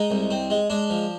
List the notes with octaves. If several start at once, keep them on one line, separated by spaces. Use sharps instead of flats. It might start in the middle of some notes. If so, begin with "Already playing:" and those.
Already playing: G#3 D#4
C2
C4
G#3
G#3 D4
F3